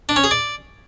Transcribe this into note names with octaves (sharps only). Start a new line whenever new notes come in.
D4
C#4
G#4
D5